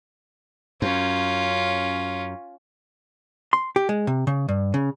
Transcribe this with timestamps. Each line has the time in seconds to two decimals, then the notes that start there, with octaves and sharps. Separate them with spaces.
0.82 F#2 C#4 F4
3.53 C6
3.76 G4
3.89 G#3
4.07 C3
4.27 C#3
4.49 G2
4.74 C#3